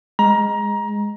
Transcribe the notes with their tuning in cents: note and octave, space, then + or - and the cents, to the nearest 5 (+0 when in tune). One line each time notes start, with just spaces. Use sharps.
G#3 -5 A#5 +20